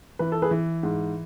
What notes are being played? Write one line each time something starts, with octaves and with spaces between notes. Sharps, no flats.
E3 B4
A4
G#4 B4
E3
G#2